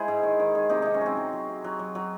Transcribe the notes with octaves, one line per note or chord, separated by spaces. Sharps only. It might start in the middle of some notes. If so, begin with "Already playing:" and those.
Already playing: G#3 E4 G#4 C5
G#2
D#3
D#3
D#3
C3 D#4
C3 D#4
C#4
F#3 C4
F#3
F#3
C3
F#3
F#3
F#3